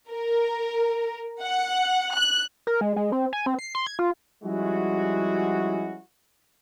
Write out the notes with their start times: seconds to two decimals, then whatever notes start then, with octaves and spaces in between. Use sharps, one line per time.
0.10 A#4
1.43 F#5
2.14 F#6
2.67 A#4
2.81 G#3
2.96 G#3
3.12 C4
3.33 G#5
3.46 C4
3.59 C7
3.75 C6
3.87 G#6
3.99 F4
4.44 F3 G3 G#3 C#4 E4 F#4